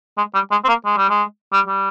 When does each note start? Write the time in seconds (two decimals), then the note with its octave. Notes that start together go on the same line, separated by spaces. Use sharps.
0.18 G#3
0.34 G3
0.51 G#3
0.64 C4
0.68 A#3
0.85 G#3
0.97 G3
1.10 G#3
1.53 G3
1.67 G3